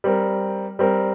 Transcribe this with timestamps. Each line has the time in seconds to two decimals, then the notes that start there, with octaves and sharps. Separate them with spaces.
0.04 G3 C4 A#4
0.79 G3 C4 A#4